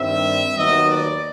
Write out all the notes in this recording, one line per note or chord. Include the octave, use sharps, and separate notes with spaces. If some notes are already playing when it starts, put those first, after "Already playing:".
Already playing: G2 D#3 G3 C4 E5
D#2 D#3 F#3 B3 D#5
D5